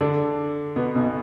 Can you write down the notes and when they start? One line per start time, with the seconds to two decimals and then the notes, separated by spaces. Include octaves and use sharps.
0.01 D3 D4
0.76 B2 B3
0.95 B1 B2